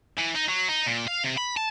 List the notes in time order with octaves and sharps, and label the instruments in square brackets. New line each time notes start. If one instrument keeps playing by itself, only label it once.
[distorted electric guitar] E3
D#4
F#3
D#4
A#2
F5
C3
B5
A5